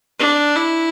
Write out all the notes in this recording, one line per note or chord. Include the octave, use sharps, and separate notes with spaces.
D4
E4